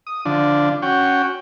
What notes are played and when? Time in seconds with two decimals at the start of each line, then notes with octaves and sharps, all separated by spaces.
0.07 D#6
0.25 D3 F3 D4
0.82 C#4 F#4 G5